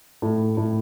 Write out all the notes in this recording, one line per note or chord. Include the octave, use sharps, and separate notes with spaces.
A2
A2